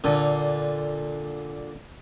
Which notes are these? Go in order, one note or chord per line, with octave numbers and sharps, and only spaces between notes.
A#2 D3